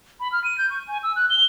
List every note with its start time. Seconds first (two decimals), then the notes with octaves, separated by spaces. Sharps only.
0.20 B5
0.32 F6
0.44 D#7
0.58 G6
0.70 C#6
0.88 G#5
1.03 E6
1.16 F#6
1.30 G7